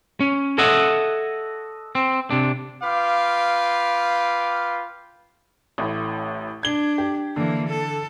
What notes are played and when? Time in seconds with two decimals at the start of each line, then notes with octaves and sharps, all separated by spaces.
0.21 C#4
0.58 A4 C#5 D#5 E5 F#5
1.95 C4
2.31 C3 D4
2.83 F4 B4 F5 G5 D6
5.78 A1 A2
6.63 D4 G#6 G7
6.98 G4
7.36 D3 E3 A#3
7.68 A4